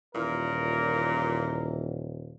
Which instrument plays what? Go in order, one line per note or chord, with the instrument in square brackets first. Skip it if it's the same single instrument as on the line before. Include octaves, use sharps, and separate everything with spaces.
[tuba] D#1 [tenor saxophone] A#2 [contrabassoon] E3 [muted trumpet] A#4